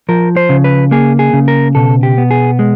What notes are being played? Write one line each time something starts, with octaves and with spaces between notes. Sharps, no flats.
F3 A#4
C5
C#3
B4
A#3 G#4
G#4
C#3
A#4
B2 A4
G4
B3
G#4
G#3